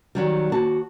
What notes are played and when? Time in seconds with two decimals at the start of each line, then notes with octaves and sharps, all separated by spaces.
0.15 D#3 F#3 G3
0.52 D#2 F#4 A5